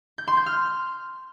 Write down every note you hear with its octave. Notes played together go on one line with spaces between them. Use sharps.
G6
C6
G6
F6